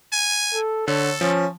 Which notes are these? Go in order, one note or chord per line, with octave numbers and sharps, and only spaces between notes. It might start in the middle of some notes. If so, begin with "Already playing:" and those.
G#5
A4
D3 A4 C#5
F3 C#4